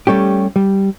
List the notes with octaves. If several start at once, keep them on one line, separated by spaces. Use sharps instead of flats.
G3 A3 C#4 G4
G3